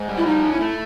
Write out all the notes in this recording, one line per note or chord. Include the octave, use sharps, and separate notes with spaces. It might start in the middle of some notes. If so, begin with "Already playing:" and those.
Already playing: G#2
G3
E4
F3 D#4
C#4
E4
A3